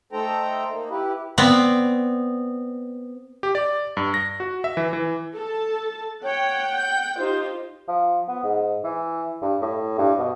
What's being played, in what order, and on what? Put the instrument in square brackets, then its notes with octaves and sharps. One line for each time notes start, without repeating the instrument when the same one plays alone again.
[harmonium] A3 D#4 A4 C5 G5 A#5
A#3 D#4
E4 G4 B4
[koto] B3 C4 D5
[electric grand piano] G4
D5
G2
A#6
F#4
E5
E3
E3
[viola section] A4 A5
[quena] C#5 [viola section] F#5 G5
[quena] G6
[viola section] D#4 F4 G4 [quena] C5
[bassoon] F3
B3
G#2
E3
G2
A2
G2
B2